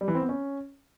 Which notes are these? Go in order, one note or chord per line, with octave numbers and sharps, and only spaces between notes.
G3
E3
C4
B3
C#4